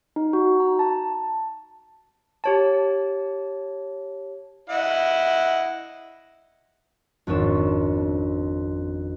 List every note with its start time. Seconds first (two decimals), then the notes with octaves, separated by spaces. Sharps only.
0.16 D#4
0.33 F#4
0.60 A#5
0.79 A5
2.44 G4 C#5 A5
4.70 E4 D#5 F#5
7.27 G#1 F2 C#4 D4 C#5 E7